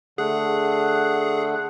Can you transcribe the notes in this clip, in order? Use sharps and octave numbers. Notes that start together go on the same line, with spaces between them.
D3 A3 G#4 F#5